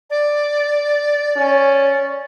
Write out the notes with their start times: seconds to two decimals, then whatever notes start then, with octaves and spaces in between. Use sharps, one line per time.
0.10 D5
1.36 C#4